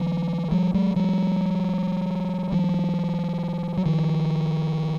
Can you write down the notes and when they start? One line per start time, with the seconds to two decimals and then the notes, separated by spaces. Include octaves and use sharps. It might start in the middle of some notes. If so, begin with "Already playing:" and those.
Already playing: D#3 F3
0.52 F3 G3
0.74 F#3 G#3
0.96 F3 G3
2.52 E3 F#3
3.77 F#3
3.86 D#3 F3